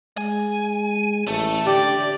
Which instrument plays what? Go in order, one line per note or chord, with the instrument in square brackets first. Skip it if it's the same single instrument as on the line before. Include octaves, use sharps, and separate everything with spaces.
[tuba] G#3 [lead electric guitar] G#5
[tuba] A1 [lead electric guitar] A3
[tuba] D3 [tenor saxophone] G4 [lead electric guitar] D5